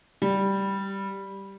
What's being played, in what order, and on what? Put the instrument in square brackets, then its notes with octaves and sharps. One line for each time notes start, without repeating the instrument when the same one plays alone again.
[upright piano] G3